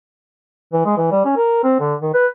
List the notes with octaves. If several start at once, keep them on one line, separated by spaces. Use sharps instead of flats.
E3
G#3
E3
G3
C#4
A#4
C4
D3
D#3
B4